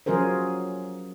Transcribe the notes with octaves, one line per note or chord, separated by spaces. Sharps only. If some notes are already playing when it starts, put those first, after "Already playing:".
F3 F#3 C#4 G#4 A#4 C5